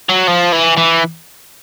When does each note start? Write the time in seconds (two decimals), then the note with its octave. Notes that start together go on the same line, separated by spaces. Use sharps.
0.09 F#3
0.28 F3
0.53 E3
0.78 E3